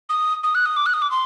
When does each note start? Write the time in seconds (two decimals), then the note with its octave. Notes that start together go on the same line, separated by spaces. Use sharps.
0.09 D#6
0.43 D#6
0.55 F#6
0.66 D#6
0.76 D6
0.86 F#6
0.93 D#6
1.02 D6
1.11 C6